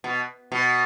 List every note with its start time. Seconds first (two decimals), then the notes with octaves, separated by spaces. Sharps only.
0.04 B2
0.52 B2